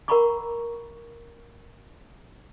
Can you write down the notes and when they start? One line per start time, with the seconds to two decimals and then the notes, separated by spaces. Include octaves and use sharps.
0.08 A#4 F#5 A#5 B5 C#6 D6